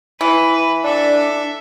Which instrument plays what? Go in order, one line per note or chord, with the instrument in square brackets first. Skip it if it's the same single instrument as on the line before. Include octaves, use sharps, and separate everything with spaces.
[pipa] E3 [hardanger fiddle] B4
[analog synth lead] D4 [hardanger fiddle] A4 E5